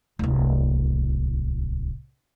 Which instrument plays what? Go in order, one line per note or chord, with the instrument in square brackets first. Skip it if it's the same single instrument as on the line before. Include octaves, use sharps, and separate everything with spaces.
[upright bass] D1 C2